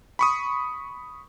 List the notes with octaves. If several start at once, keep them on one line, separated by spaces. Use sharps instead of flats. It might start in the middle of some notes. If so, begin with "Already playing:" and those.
B5 C#6 D#6